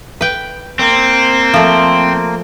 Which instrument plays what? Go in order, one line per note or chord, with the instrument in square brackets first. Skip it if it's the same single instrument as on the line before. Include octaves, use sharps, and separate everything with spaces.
[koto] B4 G5
[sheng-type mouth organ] A#3 [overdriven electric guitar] C4
[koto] F3 A3